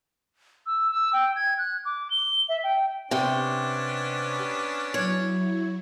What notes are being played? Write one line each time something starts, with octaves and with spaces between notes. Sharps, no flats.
E6
E6
G5
G#6
F#6
D6
G7
E5
G5
C3 B3 C#4 D4 G5
F#3 E4 C#5